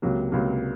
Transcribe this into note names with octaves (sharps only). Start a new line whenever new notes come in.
C#2 C3 F#3 A#3
C#2 C3 F#3 A#3